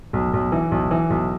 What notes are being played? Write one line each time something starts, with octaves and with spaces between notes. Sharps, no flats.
B1
B1
E3
B1
E3
B1